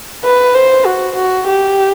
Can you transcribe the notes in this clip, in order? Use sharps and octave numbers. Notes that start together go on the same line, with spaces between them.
B4
C5
F#4
F#4
G4